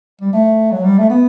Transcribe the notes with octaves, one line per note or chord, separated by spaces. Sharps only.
G3
A3
F#3
G3
A3
B3